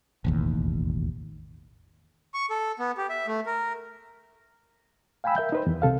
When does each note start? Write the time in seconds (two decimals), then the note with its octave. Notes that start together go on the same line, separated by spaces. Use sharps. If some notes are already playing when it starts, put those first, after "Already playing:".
0.25 E1 A1 D#2
2.34 C#6
2.50 A4
2.79 B3
2.97 G4
3.09 E5
3.27 A3
3.46 A#4
5.24 F5 G5 G#5 B5 E6
5.36 A#4 E5 G6
5.52 D#4 B4 C5
5.67 E2
5.82 C2 C3 A4 F5